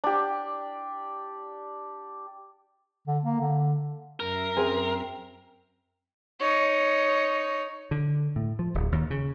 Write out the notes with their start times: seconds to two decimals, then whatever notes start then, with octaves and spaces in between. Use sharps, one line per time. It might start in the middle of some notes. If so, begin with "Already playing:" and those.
0.04 D4 G4
3.08 D3
3.25 A#3
3.41 D3
4.20 F#2 A#4 E5 C7
4.57 C4 G#4
6.40 D#4 C#5
7.91 D3
8.36 A2
8.59 F3
8.74 D1
8.92 D#2
9.10 C#3